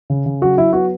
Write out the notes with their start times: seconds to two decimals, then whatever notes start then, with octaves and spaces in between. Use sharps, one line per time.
0.10 C#3
0.26 C#3
0.42 F#3 F#4
0.57 F#3 E4
0.73 B3 F#4